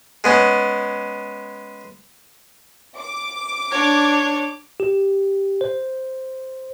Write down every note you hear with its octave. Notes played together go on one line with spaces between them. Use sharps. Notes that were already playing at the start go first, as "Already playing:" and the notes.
G#3 B3 C#4
D6
D4 C#5
G4
C5